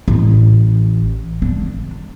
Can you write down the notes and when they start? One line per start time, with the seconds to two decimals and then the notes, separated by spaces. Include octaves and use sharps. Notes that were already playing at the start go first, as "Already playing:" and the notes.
0.08 A1
1.42 D4